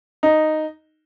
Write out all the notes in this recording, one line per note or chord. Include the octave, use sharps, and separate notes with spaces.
D#4